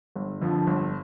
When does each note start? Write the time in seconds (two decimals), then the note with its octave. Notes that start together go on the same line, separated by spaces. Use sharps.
0.16 G1
0.41 F2 D3 F3
0.67 G1